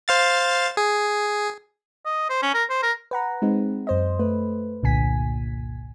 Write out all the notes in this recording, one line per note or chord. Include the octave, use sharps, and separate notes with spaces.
C5 F5 A6
G#4
D#5
C5
C#4
A#4
C5
A#4
B4 F#5 A#5
G#3 C4 D#4
F#2 C5 D#5
A3 B4
G1 C2 A#2 D3 G#5 B6